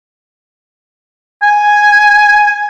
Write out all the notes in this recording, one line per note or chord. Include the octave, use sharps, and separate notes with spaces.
G#5